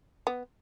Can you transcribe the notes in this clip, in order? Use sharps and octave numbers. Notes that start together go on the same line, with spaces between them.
B3